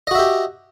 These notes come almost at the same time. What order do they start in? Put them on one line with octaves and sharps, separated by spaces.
D#5 F#4 E5 G4